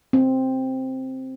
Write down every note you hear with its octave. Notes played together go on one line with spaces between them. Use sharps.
C4